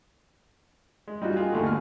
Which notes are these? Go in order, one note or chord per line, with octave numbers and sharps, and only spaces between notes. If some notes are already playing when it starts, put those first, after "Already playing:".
G#3
G3 D#4 F4 F#4
F4 G4 G#4
D#2 D3 A3
B1 F6